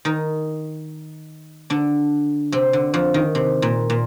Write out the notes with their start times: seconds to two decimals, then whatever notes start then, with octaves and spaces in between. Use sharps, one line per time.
0.05 D#3 D#4
1.70 D3 D4
2.52 C3 C4
2.73 D3
2.94 F2 F3
3.14 D#3
3.35 C3
3.62 A#2
3.90 A#2